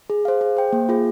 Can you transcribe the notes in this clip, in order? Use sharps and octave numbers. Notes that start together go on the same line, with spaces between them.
G#4
C5 F5
G#4
C5 G5
A#3
F4 G#4